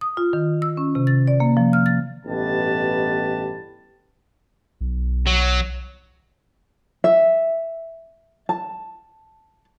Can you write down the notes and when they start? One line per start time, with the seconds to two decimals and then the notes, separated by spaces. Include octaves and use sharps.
0.01 D#6
0.17 F4
0.33 D#3
0.62 E6
0.77 C#4
0.95 C3
1.07 A6
1.28 D5
1.40 A#3
1.57 F3
1.73 F6
1.86 A6
2.26 A1 G2 B2 G4 B4 A5
4.81 B1
5.27 F#3
7.04 E5
8.49 A5